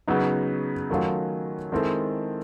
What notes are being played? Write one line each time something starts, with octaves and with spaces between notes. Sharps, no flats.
C#3 F#3 B3 D#4
D#3 F#3 A3 C#4 F4
D#3 G#3 C4 E4 A4